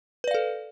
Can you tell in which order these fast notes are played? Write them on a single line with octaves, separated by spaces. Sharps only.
B4 D5 F5 A4